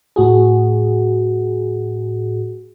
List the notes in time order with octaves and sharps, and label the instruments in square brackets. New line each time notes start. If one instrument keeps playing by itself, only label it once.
[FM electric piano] A2 F#4 G#4